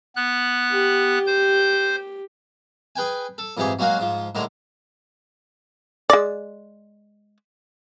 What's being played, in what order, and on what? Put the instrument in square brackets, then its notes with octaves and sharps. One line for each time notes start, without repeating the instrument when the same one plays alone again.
[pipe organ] B3 F#6
[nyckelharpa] G4
[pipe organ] C5 G6
[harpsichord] G#4 B4 G5 G#5
A4
F2 G#2 E3 G4 G#4
F#3 G#3 A#3 F#4 A#4 F5
G#2 F3
A2 D3 D#3 G#3 A#5
[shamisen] G#3 D5